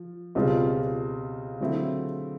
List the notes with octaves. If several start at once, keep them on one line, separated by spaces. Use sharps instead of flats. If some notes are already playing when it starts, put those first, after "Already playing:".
Already playing: F3
C#2 B2 G3 C4 F4
D3 F#3 A3 C4 E4